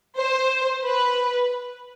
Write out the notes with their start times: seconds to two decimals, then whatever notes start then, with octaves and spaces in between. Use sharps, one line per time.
0.18 C5
0.85 B4